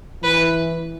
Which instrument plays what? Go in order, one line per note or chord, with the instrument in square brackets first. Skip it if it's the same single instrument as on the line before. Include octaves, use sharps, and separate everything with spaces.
[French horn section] E3 [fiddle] B4